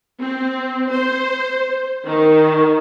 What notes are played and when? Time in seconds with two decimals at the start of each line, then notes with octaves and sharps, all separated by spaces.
0.21 C4
0.91 C5
2.06 D#3